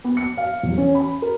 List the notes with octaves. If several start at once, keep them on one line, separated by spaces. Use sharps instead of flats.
B3
C#7
F5
E2
C#4
B5
A#4